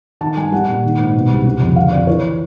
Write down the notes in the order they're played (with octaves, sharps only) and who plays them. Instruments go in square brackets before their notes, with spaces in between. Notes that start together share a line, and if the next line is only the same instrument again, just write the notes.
[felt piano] D#3 A5
G2 G#5
G3 F#5
A#2
D#3
G#2
B2
C2
C#3
F2
D3 F5
F2 D5
E3 C#5